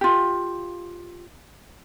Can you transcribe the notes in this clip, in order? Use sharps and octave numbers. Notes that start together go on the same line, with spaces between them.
F4 G4